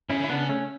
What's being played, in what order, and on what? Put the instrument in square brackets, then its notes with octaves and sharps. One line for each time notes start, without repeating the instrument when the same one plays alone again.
[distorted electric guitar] C#3 [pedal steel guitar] C#4 E4
[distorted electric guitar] D3 [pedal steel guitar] E4
[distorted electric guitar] C#3 [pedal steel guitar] B3 D4
[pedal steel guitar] A3 C#4